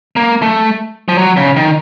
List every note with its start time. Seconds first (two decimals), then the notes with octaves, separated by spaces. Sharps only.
0.16 A#3
0.42 A3
1.08 F3
1.18 F#3
1.37 C#3
1.56 D#3